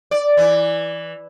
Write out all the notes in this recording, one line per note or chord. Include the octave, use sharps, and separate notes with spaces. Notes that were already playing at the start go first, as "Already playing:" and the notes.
D5
E3